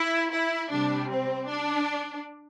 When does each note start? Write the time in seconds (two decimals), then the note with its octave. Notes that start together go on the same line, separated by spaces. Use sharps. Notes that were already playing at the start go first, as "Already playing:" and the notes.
Already playing: E4
0.32 E4
0.71 C3 G3 D4
1.10 C4
1.49 D4